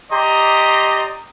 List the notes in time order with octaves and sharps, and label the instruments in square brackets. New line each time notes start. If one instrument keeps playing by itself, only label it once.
[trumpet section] G4 D5 D#5 A#5 C6